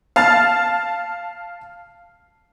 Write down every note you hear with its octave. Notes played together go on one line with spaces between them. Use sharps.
F5 A5 F6 A6